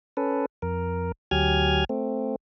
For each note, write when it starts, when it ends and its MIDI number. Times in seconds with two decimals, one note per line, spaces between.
0.17 0.46 61
0.17 0.46 69
0.17 0.46 71
0.62 1.12 41
0.62 1.12 70
1.31 1.84 38
1.31 1.84 54
1.31 1.84 67
1.31 1.84 80
1.31 1.84 89
1.31 1.84 92
1.89 2.36 57
1.89 2.36 60